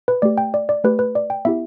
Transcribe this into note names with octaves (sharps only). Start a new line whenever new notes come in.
B4
A3 G4 D5
G5
D5
D5
A3 G4 B4
B4
D5
G5
B3 E4 G4 E5